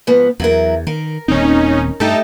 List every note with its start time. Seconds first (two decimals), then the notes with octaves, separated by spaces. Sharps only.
0.07 G#2 F3 B3
0.40 E2 F#3 E4 A#4
0.87 D#3 A#4
1.28 D#1 D#2 C4 C#4 D#4
2.00 G2 A3 D#4 G4 A4